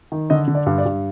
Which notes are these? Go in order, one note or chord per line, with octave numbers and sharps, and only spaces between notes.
D#3
D3 D#5
D3
D5
G2
D5
G2